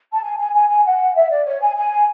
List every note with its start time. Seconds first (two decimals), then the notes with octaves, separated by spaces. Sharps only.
0.13 A5
0.23 G#5
0.39 G#5
0.54 G#5
0.69 G#5
0.85 F#5
1.15 E5
1.30 D5
1.45 C#5
1.61 G#5
1.76 G#5